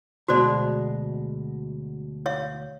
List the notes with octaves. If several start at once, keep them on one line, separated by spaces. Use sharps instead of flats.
D2 B2 G#3 F#4 C5 D5
C#5 E5 F5